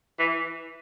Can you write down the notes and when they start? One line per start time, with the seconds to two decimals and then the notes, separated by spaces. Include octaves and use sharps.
0.19 E3